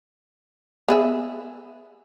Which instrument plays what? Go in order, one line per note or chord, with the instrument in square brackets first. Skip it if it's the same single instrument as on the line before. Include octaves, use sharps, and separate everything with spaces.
[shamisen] B3 G#4 E5